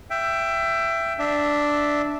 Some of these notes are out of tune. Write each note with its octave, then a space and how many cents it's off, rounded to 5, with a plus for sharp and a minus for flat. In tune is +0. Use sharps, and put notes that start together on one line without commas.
E5 +20 G5 +0
D4 +0 E5 -5